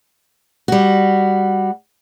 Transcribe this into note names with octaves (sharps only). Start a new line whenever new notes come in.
G3 F#4